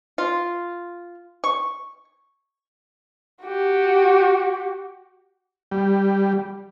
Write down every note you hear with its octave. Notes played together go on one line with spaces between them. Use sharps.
F4
C#6
F#4 G4
G3